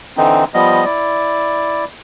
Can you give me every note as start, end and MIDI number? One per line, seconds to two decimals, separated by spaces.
0.17 0.44 50
0.17 0.44 52
0.17 0.44 60
0.17 0.44 63
0.54 0.85 53
0.54 0.85 55
0.54 0.85 59
0.54 0.85 75
0.85 1.85 64
0.85 1.85 74